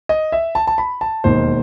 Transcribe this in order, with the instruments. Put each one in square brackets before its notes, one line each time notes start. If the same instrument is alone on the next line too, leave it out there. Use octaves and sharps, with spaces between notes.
[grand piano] D#5
E5
A5
A5
B5
A5
E1 D#2 D#3 C5